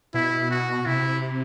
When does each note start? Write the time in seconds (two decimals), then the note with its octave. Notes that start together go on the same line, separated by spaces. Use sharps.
0.14 B2 E4
0.51 F#4
0.86 C3 E4